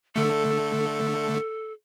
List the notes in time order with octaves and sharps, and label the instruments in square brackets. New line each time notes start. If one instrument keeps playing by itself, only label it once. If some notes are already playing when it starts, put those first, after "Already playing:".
[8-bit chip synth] D3 A3 [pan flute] A4